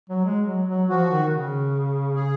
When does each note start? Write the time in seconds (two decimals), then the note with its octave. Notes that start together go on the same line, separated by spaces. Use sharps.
0.09 F#3
0.25 G#3
0.46 F#3
0.68 F#3
0.88 F3 F#4
1.10 D#3
1.31 C#3
2.15 G#4